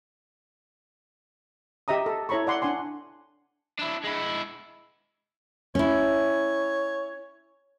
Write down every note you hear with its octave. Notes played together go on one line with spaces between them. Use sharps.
G4 D#5 E5 A#5 D#6
A4
E4 A4 C#5 A#5 B5 C#6
D5 F#5 C6
D4 F#5 G#5 C6
D4 E4
G#3 E4
C#4 E4 C#5